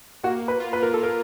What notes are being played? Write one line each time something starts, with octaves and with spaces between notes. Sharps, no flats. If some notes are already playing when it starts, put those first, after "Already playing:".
A#3 F#4
B4
F4
B4
A#4
A#3 A4
A#4